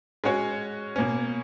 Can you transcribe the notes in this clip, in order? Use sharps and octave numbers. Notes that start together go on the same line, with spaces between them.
G#3 C#4 F#4 C#5
B2 A#3 C#4